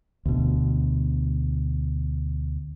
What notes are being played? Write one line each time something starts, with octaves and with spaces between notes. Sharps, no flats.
D2 B2